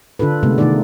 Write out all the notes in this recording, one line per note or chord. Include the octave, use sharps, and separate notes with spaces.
D3 D4 F4 A4 B4
C3 G#3 A3 B3
C3 D#3 A3 A#3 D#4 D5